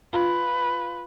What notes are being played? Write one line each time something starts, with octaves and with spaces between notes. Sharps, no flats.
F4 B4